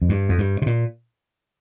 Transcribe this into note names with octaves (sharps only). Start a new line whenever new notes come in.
F2
G2
F2
G2
C3
A#2